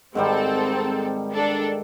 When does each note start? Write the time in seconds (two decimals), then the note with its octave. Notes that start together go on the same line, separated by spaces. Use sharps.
0.15 G#2 D#3 G3 C4 A4
1.32 D4 A4